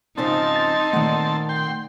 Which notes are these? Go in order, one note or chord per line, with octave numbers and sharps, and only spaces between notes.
G#2 C#3 F3 C4 D#4 A5
A6
A#2 D#3 A3 F#5
G5 C6